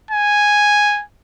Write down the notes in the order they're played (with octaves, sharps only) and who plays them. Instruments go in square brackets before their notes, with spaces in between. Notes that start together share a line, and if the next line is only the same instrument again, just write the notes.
[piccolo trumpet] G#5